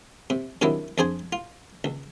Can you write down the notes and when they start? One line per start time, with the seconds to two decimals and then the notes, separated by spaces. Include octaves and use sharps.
0.30 C3
0.62 C3 D#3 F#3 D4 E4
0.98 F2 D4 G#4 C5 G#5
1.33 F4
1.84 C#2